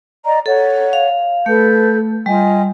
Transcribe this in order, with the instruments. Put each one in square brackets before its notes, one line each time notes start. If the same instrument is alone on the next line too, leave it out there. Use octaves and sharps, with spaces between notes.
[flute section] D5 D#5 A#5
[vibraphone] A4 [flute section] C#5 F#5
[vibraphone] F5
[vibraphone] A3 [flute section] A4 B4 G6
[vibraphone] G3 [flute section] F4 D#5 G#5